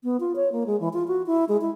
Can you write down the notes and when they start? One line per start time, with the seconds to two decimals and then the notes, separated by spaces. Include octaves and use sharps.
0.03 B3
0.20 F4
0.36 C#5
0.52 A#3
0.66 G#3
0.80 E3
0.93 F4
1.08 F#4
1.27 E4
1.49 G#3
1.61 E4